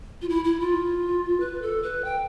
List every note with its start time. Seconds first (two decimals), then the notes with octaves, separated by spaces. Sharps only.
0.22 F4
0.29 E4
0.44 E4
0.60 F4
1.40 B4
1.62 A4
1.83 B4
2.05 G5